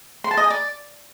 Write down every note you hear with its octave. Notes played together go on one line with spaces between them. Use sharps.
C6
A5
D#5
G#5
D5